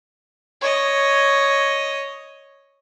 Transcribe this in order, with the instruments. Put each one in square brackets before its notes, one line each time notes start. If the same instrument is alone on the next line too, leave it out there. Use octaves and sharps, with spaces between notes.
[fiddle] C#5 D#5